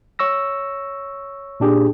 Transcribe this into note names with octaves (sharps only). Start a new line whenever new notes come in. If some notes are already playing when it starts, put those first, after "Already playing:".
C#5 C#6 E6 A#6
A#2 D4 G4 G#4